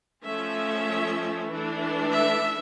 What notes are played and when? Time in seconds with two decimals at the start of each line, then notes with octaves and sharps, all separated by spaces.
0.24 F3 A3 C#4 E5
1.49 E3 A3 D4
2.12 E5